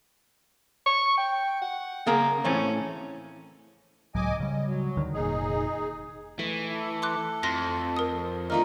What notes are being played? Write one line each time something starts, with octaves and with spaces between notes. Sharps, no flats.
C#6
G5
F#5
C#3 A#3 A#4 A#5
A2 E3 C4 C#4
C#2 A2 F#3 D#5 G#5 D6
C#3 G3 D#5
F#3
D2 D3 D#3
F1 A#2 D#4 G#4
E3 A3
A4
C6 D6 F#6
F2 C6 A#6
A#4 D#6
F3 A3 A#3 D4 D#4 F6